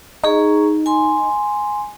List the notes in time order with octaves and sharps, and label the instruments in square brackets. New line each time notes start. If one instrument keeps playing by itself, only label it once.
[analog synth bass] D#4 [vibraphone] G#4 A#5 C#6
[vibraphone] G#5 C6